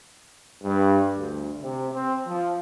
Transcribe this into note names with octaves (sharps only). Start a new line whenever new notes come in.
G2
D2
C3
C4
F3